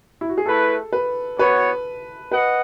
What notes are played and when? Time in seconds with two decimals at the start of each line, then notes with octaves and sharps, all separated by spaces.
0.21 E4
0.29 F#4
0.38 G#4
0.46 A3 E4 A4 B4
0.93 B4
1.39 B3 F#4 B4 C#5
2.32 B4 D#5 F#5